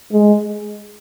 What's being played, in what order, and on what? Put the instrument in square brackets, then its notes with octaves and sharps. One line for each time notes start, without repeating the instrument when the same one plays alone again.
[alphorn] G#3